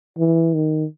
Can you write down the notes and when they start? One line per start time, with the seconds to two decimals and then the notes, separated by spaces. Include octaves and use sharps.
0.18 E3
0.54 D#3